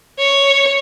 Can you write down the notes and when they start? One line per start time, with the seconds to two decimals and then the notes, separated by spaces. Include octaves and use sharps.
0.19 C#5